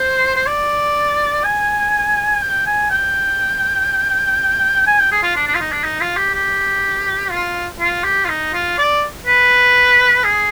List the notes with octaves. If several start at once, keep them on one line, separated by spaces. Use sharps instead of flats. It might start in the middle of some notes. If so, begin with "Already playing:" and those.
Already playing: C5
C5
D5
G#5
G5
G#5
G5
G#5
G5
G#4
F4
D4
D4
F4
D#4
D4
D#4
F4
G4
G4
F4
F4
G4
F4
D#4
F4
D5
B4
G#4